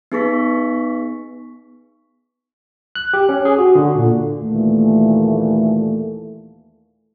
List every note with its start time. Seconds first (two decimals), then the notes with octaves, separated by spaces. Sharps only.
0.12 B3 D#4 G#4 B4 C#6 B6
2.95 F#6
3.14 G4
3.29 C#4
3.45 G#4
3.58 F#4
3.75 D3
3.95 A#2
4.38 D#2 A#2 E3 A3